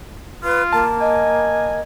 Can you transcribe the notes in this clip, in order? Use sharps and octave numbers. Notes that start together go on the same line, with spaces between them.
F4 B4
A#3 A5
D#5 G#5